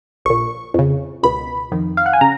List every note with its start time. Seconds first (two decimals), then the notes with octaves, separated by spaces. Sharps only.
0.25 A#1 A#2 C#6
0.74 F2 C#3
1.23 C#2 B2 B5
1.72 F2 D#3
1.97 F5
2.06 F#5
2.13 G#5
2.21 C#3 A#5